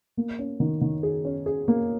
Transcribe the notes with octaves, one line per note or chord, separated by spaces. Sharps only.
A#3
C#4
D#3
D#3
G#4
C#4
G#4
A#3